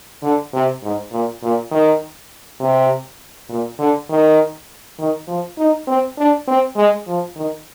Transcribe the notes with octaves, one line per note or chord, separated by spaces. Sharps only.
D3
C3
G#2
A#2
A#2
D#3
C3
A#2
D3
D#3
D#3
F3
D#4
C4
D4
C4
G#3
F3
D#3